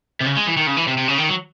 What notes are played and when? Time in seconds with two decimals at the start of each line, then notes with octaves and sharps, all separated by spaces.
0.21 C3
0.26 C#3
0.37 G#3
0.47 E3
0.57 D#3
0.67 C#3
0.77 E3
0.88 C3
0.98 C3
1.08 C#3
1.18 D#3
1.29 F#3